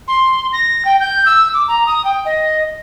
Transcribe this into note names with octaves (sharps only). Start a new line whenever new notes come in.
C6
A#6
G5
G6
E6
D6
A#5
D#6
G5
D#5